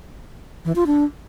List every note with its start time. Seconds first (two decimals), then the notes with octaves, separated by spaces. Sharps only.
0.65 E3
0.76 F4
0.87 D4